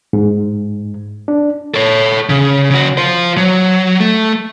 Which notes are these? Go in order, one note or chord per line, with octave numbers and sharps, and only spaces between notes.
G#2
D4
A4 C#5
C#3
C#3 F#4
F4 C5
F#3
A3